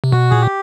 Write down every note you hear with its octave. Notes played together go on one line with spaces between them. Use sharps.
C3
B2 F#4
A#2 G#4
G4